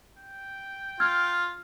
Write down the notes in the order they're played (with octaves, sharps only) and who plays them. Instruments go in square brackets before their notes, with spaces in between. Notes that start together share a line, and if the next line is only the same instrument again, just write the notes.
[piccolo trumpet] G5
[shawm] F4 [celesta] E6 F6 G#6